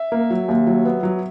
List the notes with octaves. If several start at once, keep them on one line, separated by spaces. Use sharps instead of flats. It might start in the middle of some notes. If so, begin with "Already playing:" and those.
Already playing: E5
A#3
F#3
D#2
F#3
B3
F#3